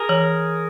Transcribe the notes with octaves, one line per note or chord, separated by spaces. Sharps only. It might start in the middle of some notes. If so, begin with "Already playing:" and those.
Already playing: G#4 A#4
E3